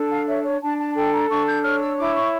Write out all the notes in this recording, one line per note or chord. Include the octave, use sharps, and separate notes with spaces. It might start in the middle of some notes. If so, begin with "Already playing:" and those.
Already playing: D4 A4
F5
C#5 E5
C#5
D4 A5
A5
A4 G5
A#5
D4 C#6
G6
C#5 F6
E6
E4 D6
C#6